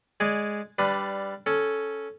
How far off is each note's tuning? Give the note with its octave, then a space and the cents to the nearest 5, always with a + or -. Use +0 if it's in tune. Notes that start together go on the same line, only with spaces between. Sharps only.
G#3 +0 D5 -5 G#5 -10
G3 +0 D4 -5 B4 +15
C#4 +0 A4 -10